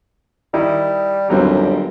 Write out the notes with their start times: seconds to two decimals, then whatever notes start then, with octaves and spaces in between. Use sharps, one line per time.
0.54 D#3 G3 D#4 E4
1.30 G1 D#2 F#3 G3 C4